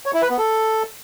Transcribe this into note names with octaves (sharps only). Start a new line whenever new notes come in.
C#5
E4
B4
B3
A4